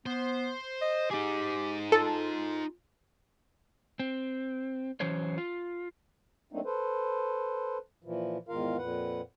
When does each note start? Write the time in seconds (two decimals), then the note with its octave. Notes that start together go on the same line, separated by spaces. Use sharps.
0.06 B3 C5
0.82 D#5
1.11 D#4 G4 G#4
1.92 F4 A4
4.00 C4
5.00 E3 F#3 C#4 C5 C#5
5.38 F4
6.53 F#3 A3 A#3 C4 D4 D#4
6.65 A4 B4 C5
8.04 A#2 E3 F3
8.49 E2 G#2 D#3 F4 A#4 F5
8.78 F2 A#2 B4 F#5